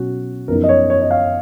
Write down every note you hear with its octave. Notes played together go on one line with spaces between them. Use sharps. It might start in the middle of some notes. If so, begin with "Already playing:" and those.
Already playing: B2 F#3 C#4 F#4
F#2 F3 B3 D#4 A#4
D#5
C#5
C#5
D#5
F5